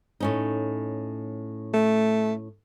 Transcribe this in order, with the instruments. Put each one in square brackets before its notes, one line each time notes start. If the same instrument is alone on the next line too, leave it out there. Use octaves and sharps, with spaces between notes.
[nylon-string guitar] A2 C#4 D#4
[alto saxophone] A3